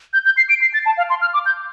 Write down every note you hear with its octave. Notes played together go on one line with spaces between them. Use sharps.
G6
G6
C7
D7
C7
A6
A5
F5
C6
F6
D6
G6